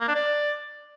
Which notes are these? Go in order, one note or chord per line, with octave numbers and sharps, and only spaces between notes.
A#3
D4
D5